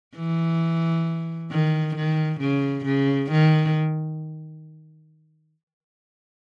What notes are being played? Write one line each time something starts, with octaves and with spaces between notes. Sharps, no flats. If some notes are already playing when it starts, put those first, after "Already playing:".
E3
D#3
D#3
C#3
C#3
D#3